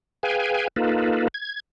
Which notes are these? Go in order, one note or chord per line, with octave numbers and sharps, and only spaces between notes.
G#4 B4 F5 G5 G#5
A#3 D#4 F4 A4 B4
G#6